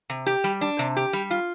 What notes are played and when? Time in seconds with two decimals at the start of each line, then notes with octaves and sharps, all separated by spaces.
0.10 C3
0.26 G4
0.44 G3
0.61 D4
0.79 C3
0.96 G4
1.13 G3
1.31 F4